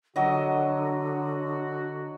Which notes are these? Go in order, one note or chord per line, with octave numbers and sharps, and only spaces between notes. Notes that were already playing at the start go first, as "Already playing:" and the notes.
D3 F#3 F#4 D#5